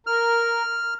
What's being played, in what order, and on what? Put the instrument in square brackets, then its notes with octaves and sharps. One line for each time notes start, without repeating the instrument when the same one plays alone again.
[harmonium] A#4 [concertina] F6